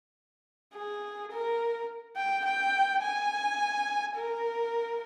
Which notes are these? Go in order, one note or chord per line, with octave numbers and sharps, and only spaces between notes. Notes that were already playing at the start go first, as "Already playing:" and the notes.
G#4
A#4
G5
G5
G#5
A#4